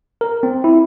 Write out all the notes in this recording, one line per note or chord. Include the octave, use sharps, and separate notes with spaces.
A#4
C4
E4